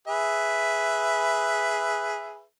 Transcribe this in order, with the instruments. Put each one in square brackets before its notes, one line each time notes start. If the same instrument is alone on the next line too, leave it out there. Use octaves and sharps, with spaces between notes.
[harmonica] G#4 B4 E5